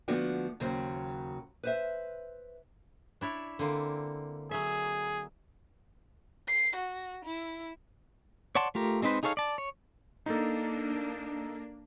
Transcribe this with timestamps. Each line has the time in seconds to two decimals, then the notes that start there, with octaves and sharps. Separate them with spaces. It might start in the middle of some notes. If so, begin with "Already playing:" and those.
0.08 D3 F3 A3 B3 D4 F#4
0.60 D#2 C#3 F#3 C5
1.63 B4 C5 E5
3.21 D4 E4 C#5
3.59 D3 A#3 C4
4.51 F#3 G#4 E5
6.47 C7
6.76 F#4
7.25 E4
8.55 C#5 D5 F#5 A5 C6
8.75 A3 F4 G4 A#4
9.02 G#3 C4 D#4 B4 C5
9.23 D#4 G#4 A4 C#5 F5
9.37 D5 A5
9.58 C#5
10.26 A#3 D4 D#4 A4